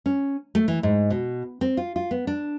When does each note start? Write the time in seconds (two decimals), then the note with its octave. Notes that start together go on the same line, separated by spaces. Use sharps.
0.06 C#4
0.55 A3
0.68 E3
0.83 G#2
1.10 B2
1.61 C4
1.77 F4
1.96 F4
2.11 B3
2.27 D4